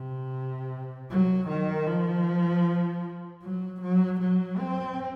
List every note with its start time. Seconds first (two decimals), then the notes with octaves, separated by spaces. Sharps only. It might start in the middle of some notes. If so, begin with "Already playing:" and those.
Already playing: C3
1.10 F#3
1.48 D#3
1.87 F3
3.43 F#3
3.82 F#3
4.21 F#3
4.59 C4